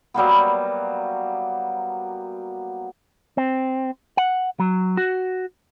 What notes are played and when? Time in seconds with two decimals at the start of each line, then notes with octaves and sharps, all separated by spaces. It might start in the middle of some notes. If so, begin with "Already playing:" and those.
0.14 F#3 G3 A#3 B3
3.37 C4
4.17 F#5
4.60 F#3
4.97 F#4